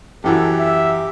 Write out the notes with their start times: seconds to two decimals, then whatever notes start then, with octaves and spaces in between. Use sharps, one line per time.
0.24 F#2 E3 F#4 G4 A4
0.59 E5